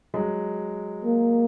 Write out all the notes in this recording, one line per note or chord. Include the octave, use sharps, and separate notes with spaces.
F#3 G#3
A#3